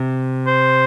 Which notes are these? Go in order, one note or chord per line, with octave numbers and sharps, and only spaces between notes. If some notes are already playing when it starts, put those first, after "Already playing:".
Already playing: C3
C5